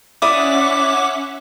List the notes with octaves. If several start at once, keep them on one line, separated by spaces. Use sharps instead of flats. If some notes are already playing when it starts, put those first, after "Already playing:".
C#4 E4 D5 E5 F#5 D6 D#6